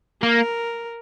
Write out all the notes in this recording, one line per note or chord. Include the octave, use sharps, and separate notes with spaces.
A#3 A#4